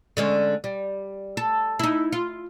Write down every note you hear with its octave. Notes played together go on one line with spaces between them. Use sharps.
D3 G#3 C#4
G3
A4
D#4 E4
F4